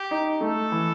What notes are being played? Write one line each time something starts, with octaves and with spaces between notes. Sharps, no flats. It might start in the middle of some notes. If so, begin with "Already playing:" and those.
Already playing: G4
D#4
A3 A4
E3